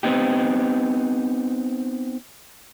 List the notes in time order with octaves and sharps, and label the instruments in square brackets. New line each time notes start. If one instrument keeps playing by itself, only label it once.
[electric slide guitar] B3 C4 D#4 G4